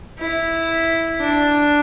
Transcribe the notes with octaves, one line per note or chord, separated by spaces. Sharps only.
E4
D4